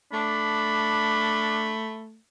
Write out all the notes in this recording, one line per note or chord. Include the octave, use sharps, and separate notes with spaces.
A3 D4 B5